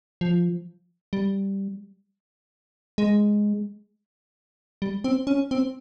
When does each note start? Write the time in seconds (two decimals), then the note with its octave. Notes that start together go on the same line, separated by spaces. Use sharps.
0.21 F3
1.13 G3
2.98 G#3
4.82 G3
5.04 C4
5.27 C#4
5.51 C4